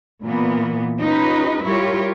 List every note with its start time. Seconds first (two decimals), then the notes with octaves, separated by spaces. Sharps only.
0.23 A#2 E3 A#3 B3
1.00 C#4 D#4 F4 G4 B4
1.64 G3 E4 F4 G4 A#4 C#5